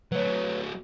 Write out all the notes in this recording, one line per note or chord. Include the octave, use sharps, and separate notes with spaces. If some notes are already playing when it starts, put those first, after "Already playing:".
F#3 A3 B4 C#5